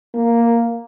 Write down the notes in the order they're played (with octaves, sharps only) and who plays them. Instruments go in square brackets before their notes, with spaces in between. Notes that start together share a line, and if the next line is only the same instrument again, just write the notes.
[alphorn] A#3